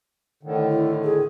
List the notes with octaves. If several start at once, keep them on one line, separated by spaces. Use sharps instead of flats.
A2 D3 D#3
E4
G#4